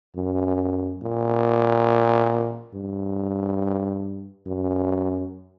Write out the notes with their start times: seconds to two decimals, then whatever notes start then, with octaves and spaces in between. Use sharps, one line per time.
0.15 F#2
1.02 A#2
2.74 G2
4.47 F#2